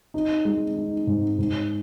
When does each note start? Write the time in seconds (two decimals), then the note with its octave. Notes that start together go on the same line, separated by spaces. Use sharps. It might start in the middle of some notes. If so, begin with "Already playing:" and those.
0.14 D#4
0.45 G#3
0.76 D#4
1.07 G#2
1.38 G#2